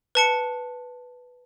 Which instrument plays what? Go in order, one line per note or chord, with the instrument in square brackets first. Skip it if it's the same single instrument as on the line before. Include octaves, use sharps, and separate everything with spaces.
[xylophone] B4 A5 C#7